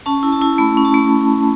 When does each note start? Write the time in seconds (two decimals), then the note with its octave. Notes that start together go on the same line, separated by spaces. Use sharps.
0.06 C#4 A5
0.23 E4
0.32 A5
0.42 E4
0.58 A3 B5
0.77 C#4
0.85 A5
0.94 A3